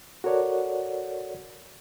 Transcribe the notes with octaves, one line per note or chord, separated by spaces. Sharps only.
F#4 A4 A#4 C#5 D5 F#5